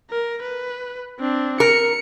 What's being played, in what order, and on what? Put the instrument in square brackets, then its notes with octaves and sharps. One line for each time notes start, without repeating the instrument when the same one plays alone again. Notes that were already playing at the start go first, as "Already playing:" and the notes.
[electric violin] A#4
B4
C4 D4
[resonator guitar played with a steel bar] A#4 [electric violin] C#7